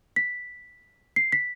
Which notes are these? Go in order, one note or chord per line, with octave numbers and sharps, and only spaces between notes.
B6
C7
B6